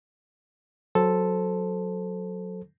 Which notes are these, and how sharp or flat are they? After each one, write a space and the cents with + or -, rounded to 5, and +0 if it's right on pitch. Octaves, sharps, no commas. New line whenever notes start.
F#3 -10 A4 +0 C5 +0